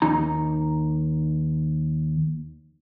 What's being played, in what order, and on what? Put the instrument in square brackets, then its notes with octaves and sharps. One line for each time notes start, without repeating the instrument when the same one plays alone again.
[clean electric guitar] D#2 D#4 A#5